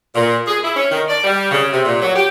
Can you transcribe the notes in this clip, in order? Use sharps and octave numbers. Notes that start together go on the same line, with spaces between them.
A#2
G#4
E4
C#4
D#3
D5
G3
C#3
C3
A#2
F#3
G4